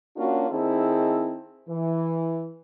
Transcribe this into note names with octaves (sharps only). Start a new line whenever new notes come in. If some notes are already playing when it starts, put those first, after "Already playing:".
A#3 C#4 D4 F4 F#4
D#3 C4 D#4 E4 G#4 A4
E3